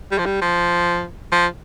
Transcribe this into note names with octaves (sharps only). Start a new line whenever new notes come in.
G3
F3
G3
F3
F3